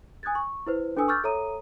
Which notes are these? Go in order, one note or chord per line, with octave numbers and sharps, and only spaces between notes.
G#5 D#6 F#6 G#6 A6
C#6
E4 B4 C5
D4 A4 B4 G#5 D#6 E6
C#6 D6 E6 F6 G6 A6
A4 C#5 E5 A#5 D#6 D#7